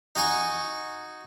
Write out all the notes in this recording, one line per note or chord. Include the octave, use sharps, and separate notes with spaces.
D#4 F#4 G#5 C#6